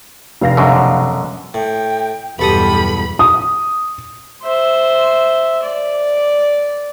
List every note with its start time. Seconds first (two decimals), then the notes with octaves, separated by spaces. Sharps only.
0.41 F1 F5 A#6
0.57 F#2 B2 D3
1.54 A2 G5
2.39 B1 E2 G2 G4 A4 B5 D#6
3.19 D#6
4.42 C5 E5
5.63 D5